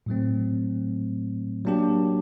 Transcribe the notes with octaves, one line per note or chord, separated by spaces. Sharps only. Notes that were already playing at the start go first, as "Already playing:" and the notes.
A2 F#3 A3 C4
F#3 A#3 D4 G4